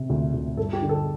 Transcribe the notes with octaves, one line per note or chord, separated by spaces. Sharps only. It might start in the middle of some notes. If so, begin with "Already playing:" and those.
Already playing: C3
D2
D2
G2 A4
G4
D3
A4